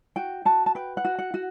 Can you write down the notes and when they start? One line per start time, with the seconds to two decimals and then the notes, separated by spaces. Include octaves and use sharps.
0.16 F#4 G5
0.45 F#4 A5
0.66 A5
0.75 B4 G5
0.97 F#5
1.05 F#4
1.19 F#5
1.34 F#4